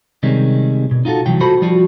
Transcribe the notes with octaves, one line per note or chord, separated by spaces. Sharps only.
C3 D#3 G3 G#3 C#4
B2
D#4 F4 F#4 G#4 A4
C2 E3 F#3 G5
F4 F#4 A4 C5 B5
F3 G3 F4 F#4